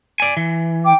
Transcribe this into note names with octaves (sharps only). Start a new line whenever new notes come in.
D5 G#5
E3
G5 D6